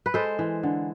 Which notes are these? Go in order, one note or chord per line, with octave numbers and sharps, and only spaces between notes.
B4
G#3 A4 C5
E3
D3